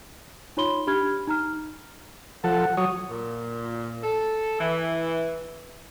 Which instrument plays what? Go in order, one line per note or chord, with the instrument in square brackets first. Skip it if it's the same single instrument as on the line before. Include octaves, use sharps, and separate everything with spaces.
[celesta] D#4 F4 C#5 B5 C6 G7
D4 G4 B5 F6 G#6
D#4 A#5 F6
[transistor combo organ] F3 A4 [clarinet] F#5
[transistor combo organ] F#3 C#5 [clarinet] D#6
[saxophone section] A#2
A4
E3